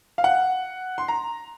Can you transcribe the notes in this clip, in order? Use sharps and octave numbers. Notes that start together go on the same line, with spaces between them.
F5
F#5
C6
A#5